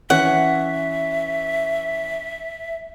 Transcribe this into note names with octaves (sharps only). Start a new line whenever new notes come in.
E3 C#4 C#5 E5 F#5